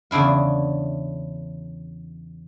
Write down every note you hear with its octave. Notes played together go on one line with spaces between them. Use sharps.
E2 C#3 D4 E4 F5